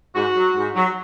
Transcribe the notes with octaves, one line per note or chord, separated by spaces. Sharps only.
G#2 F#4
F#3
G#2
F#3